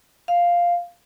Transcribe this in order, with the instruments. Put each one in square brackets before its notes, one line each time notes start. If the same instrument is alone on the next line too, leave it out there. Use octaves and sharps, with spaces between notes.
[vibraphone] F5